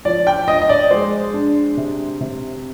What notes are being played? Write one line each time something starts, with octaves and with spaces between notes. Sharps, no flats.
F3 D5
G5
F3 D#5
D#5
D5
G#3 C5
D4
C3
C3